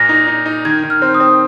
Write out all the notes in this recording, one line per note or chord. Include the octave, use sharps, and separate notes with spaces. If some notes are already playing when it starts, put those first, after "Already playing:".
Already playing: A#2 A#6
D#4
D#4
D#4
D#3 G#6
D#3
F6
C4
D#6
C4